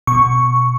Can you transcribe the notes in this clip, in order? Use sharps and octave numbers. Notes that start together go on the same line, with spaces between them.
B2 C#6